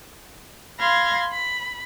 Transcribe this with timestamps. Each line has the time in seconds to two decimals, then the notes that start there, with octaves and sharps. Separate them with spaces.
0.80 F5 B5 C6 G#6 A#6
1.32 B5